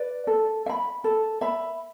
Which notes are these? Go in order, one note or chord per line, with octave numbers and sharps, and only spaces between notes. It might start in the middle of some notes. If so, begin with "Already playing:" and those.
Already playing: B4 D5
A4
E5
B5
A4
E5 B5